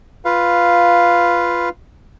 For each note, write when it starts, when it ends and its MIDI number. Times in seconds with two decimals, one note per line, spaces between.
0.25 1.69 65
0.25 1.69 71
0.25 1.69 77